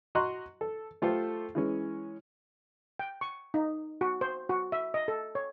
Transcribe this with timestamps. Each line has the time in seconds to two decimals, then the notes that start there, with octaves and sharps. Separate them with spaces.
0.15 F#4 D#5 A#5 C6 C#6 F#6
0.61 A4
1.02 A3 F4 G4 A4 C5
1.55 E3 G#3 C#4
2.99 G5
3.21 C#6
3.54 D#4
4.01 F#4
4.21 C5
4.49 F#4
4.72 E5
4.94 D#5
5.08 A4
5.35 C#5